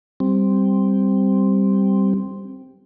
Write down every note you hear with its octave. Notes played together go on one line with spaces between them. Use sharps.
G3 C4